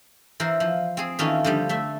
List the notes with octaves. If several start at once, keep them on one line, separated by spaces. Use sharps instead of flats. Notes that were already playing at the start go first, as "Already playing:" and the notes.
E3 A#4 C5
F3
C4 G#4
D#3 E3 A3 C#4 D#4 F4
D3 F3 G3
A3 E5